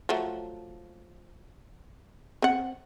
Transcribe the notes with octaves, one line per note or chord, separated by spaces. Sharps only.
F3 F#3 A3
C4 F#5